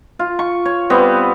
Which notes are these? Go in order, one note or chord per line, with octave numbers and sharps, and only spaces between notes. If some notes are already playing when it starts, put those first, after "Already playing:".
F4
C#6
C#5
G3 B3 C4